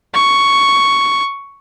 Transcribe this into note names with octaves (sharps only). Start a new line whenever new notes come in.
C#6